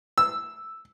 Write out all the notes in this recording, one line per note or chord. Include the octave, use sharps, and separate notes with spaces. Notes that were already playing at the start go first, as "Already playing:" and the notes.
E6